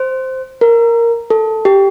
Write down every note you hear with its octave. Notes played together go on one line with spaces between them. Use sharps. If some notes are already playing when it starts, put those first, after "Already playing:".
Already playing: C5
A#4
A4
G4